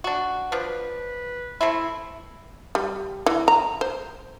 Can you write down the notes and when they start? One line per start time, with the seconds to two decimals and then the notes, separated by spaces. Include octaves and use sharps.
0.04 D4 F#4
0.52 F3 D4 B4
1.61 A3 C4 E4
2.75 G3
3.26 E3
3.48 A#5
3.81 C5